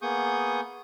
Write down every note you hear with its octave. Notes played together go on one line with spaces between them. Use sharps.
A#3 B3 G#4 C#6 D#6 G6